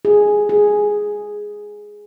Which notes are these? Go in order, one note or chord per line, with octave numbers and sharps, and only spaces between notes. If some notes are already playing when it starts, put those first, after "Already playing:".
G#4
G#4